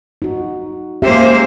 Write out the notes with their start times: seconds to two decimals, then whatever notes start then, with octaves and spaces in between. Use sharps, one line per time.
0.22 D#4 F#4
1.02 G#3 A#3 C#4 G4 C5 E5